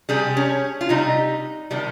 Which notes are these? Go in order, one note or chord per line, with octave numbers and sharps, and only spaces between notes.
C3 G3 G#4
C#4
F4
C3 G3 D#4
C3 D#3 G3